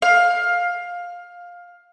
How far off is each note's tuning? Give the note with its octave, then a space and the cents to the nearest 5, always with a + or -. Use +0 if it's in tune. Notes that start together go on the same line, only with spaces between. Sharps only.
F5 +15